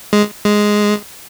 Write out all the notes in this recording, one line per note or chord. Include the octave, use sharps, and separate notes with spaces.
G#3
G#3